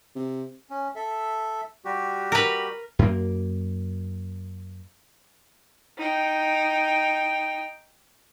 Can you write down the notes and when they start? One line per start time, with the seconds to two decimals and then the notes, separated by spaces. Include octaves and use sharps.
0.16 C3
0.70 C#4
0.96 A4 E5
1.85 G3 F#4 G4
2.32 A#4 B4
2.99 F#2 A#3
5.98 D#4 G5